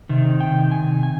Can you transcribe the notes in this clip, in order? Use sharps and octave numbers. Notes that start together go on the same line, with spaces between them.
C3 D#3
G5
G#5
G#5